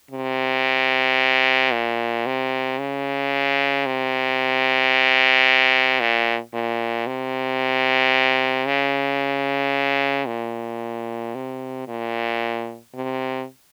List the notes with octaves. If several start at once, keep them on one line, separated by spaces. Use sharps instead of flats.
C3
A#2
C3
C#3
C3
A#2
A#2
C3
C#3
A#2
C3
A#2
C3